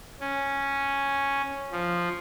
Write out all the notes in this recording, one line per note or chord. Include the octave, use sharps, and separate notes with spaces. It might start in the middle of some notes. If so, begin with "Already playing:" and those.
C#4
F3